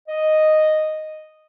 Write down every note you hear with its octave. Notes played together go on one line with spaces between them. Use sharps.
D#5